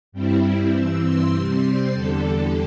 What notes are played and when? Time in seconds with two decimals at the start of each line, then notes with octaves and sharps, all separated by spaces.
0.12 G2 G3 C4 E4
0.73 G2 E3 C4 E6
1.02 C6
1.33 C3 G3 C4
1.63 C5
1.93 E2 D3 G3 A4